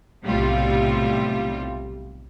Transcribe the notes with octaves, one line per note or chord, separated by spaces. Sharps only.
B1 A2 C3 G3 F4